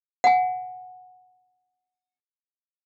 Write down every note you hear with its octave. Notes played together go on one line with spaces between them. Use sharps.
F#5 G#5